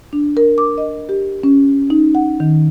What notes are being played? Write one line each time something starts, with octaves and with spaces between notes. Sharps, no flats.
D4
A#4
D6
D#5
G4
C#4
D#4
F#5
D#3